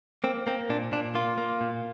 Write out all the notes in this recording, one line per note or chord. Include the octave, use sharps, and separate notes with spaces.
A#3 C4
A#3 C4
A#2 D4
A#2 D4
A#3 F4
A#3
A#2